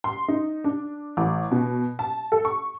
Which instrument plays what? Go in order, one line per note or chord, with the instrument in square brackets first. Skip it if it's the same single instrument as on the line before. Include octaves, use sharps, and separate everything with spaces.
[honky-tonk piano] C6
D#4
D4
A1
B2
A5
A4
C#6